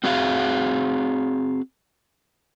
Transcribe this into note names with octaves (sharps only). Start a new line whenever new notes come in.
C4 F#4 G#4 F5